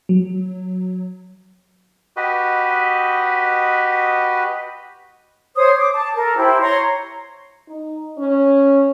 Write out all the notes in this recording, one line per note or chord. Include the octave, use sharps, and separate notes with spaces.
F#3
F#4 G4 B4 D#5
C5 C#5 D#6
D6
A5
A4 A#4
E4 G4 C5
C#5 A#5 C6
D#4
C#4